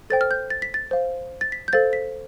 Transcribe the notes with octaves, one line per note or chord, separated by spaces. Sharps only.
A4 C5 G5 A6
F6
G6
A6
B6
A6
C5 F5
A6
B6
G6
A4 C5 F5 A6
B6